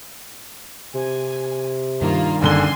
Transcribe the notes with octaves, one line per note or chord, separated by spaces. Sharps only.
C3 G#5
G2 D#3 A#3 F4
F#1 D3 G#5 C6 G7